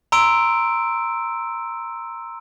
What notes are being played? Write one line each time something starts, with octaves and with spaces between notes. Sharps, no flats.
A#5 C6 E6 D7